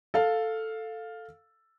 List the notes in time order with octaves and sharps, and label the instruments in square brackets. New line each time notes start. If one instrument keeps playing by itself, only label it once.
[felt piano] A4 F5